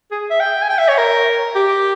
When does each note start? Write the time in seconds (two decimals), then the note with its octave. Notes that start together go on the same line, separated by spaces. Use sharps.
0.11 G#4
0.30 E5
0.40 G5
0.62 G#5
0.69 G5
0.79 E5
0.88 C#5
0.98 A#4
1.55 G4